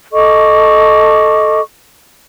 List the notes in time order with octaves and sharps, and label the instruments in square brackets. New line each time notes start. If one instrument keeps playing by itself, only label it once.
[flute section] A4 D#5 C#6 D6